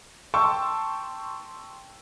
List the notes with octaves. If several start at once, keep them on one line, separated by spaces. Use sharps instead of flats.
G5 A5 C6 C#6 E6